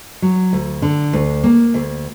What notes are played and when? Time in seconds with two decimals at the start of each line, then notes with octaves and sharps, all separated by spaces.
0.22 F#3
0.53 D2
0.82 D3
1.13 D2
1.44 A#3
1.74 D2